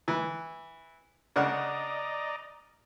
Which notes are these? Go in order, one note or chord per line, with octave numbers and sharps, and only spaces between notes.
E3
C#3 D4 D5 D#5 F#5 A#5